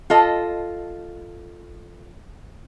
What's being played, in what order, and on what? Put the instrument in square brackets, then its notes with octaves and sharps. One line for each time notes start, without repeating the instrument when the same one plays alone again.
[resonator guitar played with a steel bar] F4 A4 D#5